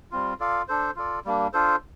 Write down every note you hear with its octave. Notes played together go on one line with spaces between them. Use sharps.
G3 C4 F4
F4 A4 D5 F5
D4 A4 C5
F4 A4 D5
G3 A#3 D4
D4 F4 A4 C5